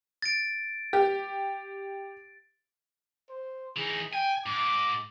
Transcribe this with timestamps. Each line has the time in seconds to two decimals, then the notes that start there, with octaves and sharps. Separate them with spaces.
0.22 A6 D7
0.93 G4
3.30 C5
3.77 E3 D#4 G#4
4.13 G5 G#5
4.46 G#2 D6